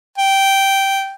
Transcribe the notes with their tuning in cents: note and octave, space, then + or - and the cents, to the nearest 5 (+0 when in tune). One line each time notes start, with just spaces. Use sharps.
G5 -10